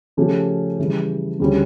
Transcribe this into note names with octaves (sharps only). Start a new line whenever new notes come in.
C#3 F3 A3 C#4 G4
C#3 E3 G3
D2 C#3 G3 C#4